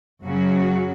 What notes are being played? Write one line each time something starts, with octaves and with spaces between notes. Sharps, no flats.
F#2 C#3 F#3 F#4